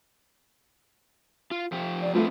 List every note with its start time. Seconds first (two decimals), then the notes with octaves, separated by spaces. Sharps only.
1.51 F4
1.72 F3 G4
2.01 D5
2.15 D3 F3 A3 C4 B4